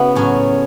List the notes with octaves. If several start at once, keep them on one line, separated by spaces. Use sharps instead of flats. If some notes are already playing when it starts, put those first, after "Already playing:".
Already playing: C#3 B3 E4 F#4
A2 F#3 C#4